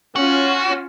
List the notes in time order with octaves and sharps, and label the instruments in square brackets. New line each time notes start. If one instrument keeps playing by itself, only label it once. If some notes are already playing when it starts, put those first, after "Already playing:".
[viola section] C#4 F4 [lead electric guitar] F#4